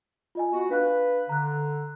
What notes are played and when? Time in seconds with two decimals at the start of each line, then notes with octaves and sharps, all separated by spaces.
0.35 F4 D#5 G#5
0.52 B3 F#4
0.70 D4 B4 F5 F#6
1.29 D3 A#5 F#6